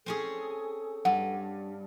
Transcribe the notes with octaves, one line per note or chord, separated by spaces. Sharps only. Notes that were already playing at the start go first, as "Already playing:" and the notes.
C4 C#4 G#4 A4
G2 F#5